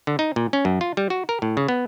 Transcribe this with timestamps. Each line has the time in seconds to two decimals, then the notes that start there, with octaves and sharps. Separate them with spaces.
0.07 D3
0.19 D#4
0.36 A#2
0.53 C#4
0.65 F#2
0.81 F4
0.97 G3
1.10 F#4
1.29 A#4
1.42 A2
1.57 C#3
1.68 B3